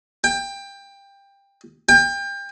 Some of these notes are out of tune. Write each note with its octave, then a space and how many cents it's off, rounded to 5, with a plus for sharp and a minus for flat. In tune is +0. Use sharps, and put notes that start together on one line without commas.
G5 +20
G5 +30